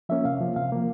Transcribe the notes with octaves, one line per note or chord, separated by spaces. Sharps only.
F3 A#3 C#4 E5
C3 F5
F3 A#3
C3 F5
F3 A#3